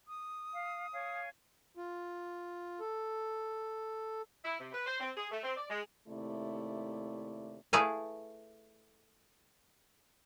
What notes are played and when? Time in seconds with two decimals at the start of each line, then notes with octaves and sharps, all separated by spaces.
0.08 D#6
0.53 F5
0.92 C#5 F5 G#5
1.77 F4
2.80 A4
4.45 E4
4.59 C3
4.73 B4
4.87 C5
5.00 C4
5.17 G#4
5.31 A3
5.43 C4
5.57 D5
5.70 G#3
6.07 D#2 C3 A3 E4 D5
7.73 A3 E4 G#4 B4 F5 G#5